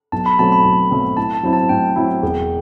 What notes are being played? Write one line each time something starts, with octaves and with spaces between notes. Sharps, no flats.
B1 A5
B5
B2 F#3 A3 C4 A5
B5
B1
B2 F#3 A3 C4
A2 A5
A5
F#3 C4 E4
A5
A2 G5
F#3 C4 E4
E1